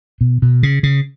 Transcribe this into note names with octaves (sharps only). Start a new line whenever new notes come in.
B2
B2
C#3
C#3